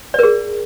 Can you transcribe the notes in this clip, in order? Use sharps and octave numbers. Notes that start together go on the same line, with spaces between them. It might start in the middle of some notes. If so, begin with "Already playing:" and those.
G#4 A#4 D5